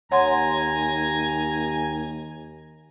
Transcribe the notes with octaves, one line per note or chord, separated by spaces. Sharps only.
D#2 C#5 F#5 G#5 A#5 C6